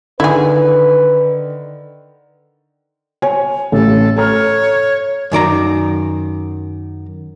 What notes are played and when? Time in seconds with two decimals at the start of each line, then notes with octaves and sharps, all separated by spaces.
0.20 D3 D#3 E4 G#4 B4
3.22 C#5 G#5
3.72 A1 A4
4.17 A4 C#5 A#5 F6
5.32 F#2 D#3 D5 A#5